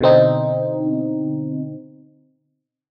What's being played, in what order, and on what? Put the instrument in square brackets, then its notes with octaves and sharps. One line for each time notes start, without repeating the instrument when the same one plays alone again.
[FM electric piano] B2 D3 C4 D#4